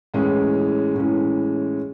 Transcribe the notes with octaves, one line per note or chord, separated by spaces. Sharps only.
A2 E3 G#3 C#4
A2 E3 G#3 C#4